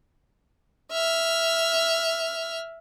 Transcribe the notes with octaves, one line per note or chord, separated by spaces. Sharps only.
E5 F6